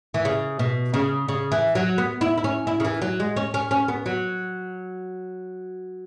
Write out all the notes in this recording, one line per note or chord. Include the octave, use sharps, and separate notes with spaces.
E3
C#3
B2
C#3
C#3
E3
F#3
B3
E4
E4
C#4
E4
C#3
E3
F#3
G#3
C#4
C#4
C#4
B3
F#3